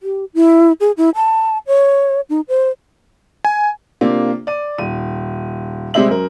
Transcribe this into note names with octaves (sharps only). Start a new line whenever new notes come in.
G4
E4
G#4
E4
A5
C#5
D#4
C5
G#5
C3 A#3 D4 F4
D5 D#7
D#1 D#7
C3 G3 G#3 C5 E5 F#7
F#2 A#4